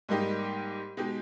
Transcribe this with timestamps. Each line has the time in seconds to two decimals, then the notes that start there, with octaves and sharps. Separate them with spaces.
0.09 G#2 G3 A#3 D#4 G4
0.97 B2 G#3 D#4 G4